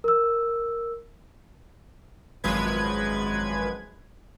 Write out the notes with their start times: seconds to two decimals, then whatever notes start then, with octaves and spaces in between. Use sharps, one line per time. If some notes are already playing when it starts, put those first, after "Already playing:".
0.04 A#4 E6
2.44 G#1 F#2 F3 G#3 B4 G#6